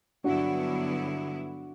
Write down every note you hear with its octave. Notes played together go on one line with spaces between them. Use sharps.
G2 D3 F#3 B3 D4 E4 F#4